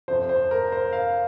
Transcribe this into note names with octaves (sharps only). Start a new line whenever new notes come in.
F2 C3 F3 C5
C5
A#4
C5
F5